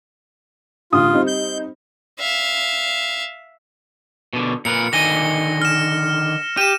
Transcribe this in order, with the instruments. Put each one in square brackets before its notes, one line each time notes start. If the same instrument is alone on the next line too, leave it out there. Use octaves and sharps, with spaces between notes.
[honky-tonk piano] A1 D3 D#6 [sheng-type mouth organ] F4
[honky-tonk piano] G3 C4 D#4
[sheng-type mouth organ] G6
[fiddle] E5 F5
[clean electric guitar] B2 D3
[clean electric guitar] A#2 A#4 B4 [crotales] C#7
[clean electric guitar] D3 D#3 G#5 [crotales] A#6 G7
[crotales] F6 E7
[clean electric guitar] G4 [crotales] D#7 E7